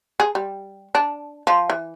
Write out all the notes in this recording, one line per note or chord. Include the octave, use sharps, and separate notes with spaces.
G#4
G3
D4
F3
E3